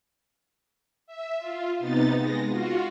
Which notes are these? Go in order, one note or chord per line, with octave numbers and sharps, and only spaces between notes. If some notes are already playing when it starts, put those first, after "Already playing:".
E5
F4
C3 B3 D#4 A6
G#3 A#6
F4 F#4